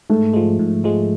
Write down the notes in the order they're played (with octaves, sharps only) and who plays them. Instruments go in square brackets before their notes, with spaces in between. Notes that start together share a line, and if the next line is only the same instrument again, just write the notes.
[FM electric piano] G#2 [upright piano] A3
[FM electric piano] F3 G#3
G#2
F3 G#3